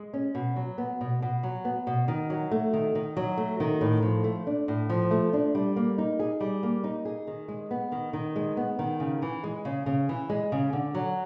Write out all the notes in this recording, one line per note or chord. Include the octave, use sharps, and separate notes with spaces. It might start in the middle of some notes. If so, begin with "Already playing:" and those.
Already playing: G#3
C#4
B2
F#3
B3
B2
B2
F#3
B3
B2
D#3
F#3
A3
D#3
D#3
F#3
A3
D#3
A2
F3
A3
D4
A2
F3
A3
D4
G3
A#3
D#4
G#4
G3
A#3
D#4
G#4
D#3
G#3
B3
D#3
D#3
G#3
B3
D#3
C#3
E3
G#3
C#3
C#3
E3
G#3
C#3
D3
F#3